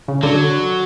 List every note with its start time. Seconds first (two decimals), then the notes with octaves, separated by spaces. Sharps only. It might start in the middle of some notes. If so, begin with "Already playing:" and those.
0.08 C#3
0.23 D3 F#3